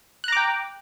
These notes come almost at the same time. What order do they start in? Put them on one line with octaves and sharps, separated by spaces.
F#6 A#5 D6 G5